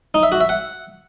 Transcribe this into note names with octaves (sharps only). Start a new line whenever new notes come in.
D#4
E5
F#4
E5
F#5